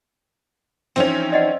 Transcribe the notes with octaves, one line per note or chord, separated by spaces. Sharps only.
E3 F3 C4 C#4 D#4
D5 D#5 F#5